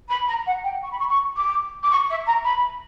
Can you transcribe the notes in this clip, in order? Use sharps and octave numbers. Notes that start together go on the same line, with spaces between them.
B5
A#5
F#5
G5
C#6
B5
C#6
C#6
D6
D6
C#6
E5
A#5
B5